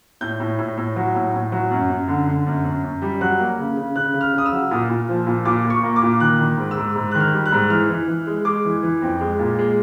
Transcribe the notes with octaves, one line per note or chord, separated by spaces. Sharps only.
A2 G6
A2
A2
A2
F#3
A2
A2
F#3
F#2
F#2
D3
D3
F#2
F#2
F#2
G3
F#3 F#6
A#3
C#3
C#3
C#3 F#6
C#3
F6
C#3 D#6
E6
F#3
A#2 D#6
A#2
F3
A#2
A#2 D6
A#2
C#6
A#3
D6
A#2
D#3 F#6
D#3
G#2
E6
G#2
G#2
D#3 F#6
F6
G3
F#6
G#2
E3 F6
E3
E3
G#3
G#3 D6
E3
E3
F2
G#3
A#2
G#3